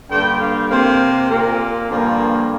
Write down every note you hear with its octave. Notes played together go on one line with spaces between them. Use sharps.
G2 D3 G3 A#3 G5
F5
C3 A#3 C5
A#2 A#3 A#4
G2 D3 F3 A#3